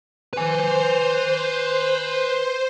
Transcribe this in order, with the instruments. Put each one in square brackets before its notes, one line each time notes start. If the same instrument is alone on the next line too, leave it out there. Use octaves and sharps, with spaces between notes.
[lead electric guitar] B4 G#5 [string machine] C5